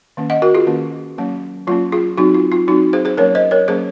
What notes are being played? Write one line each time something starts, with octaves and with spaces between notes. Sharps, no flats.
D#3 A#3 C#4
D#5 F#5
F#4 A#4
F4 G#4
D#3 A#3 C#4
F#3 A#3 C#4
F#3 A#3 C#4 F4
F4 G#4
F#3 C4 D#4 F#4
F4
F4
F#3 C4 D#4 F#4
G#4 C5
G#4 C5
F#3 A#3 C#4 A#4 C#5
C5 D#5
A#4 C#5
F#3 A#3 C#4 G#4 C5